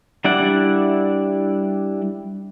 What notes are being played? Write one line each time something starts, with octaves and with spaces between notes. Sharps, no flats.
G3 D4 E4 D5 F#5